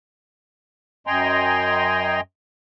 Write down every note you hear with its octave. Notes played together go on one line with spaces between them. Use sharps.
F#2 D#5 G5 G#5 A#5 C6